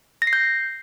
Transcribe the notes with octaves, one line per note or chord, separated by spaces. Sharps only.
A#6
C7
G6